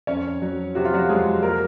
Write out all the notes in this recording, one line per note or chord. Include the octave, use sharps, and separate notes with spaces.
F2 C#4 C#5
F#3
C3 F#4
F4
F#3 F#4
F2 G#3 G#4
A#3 A#4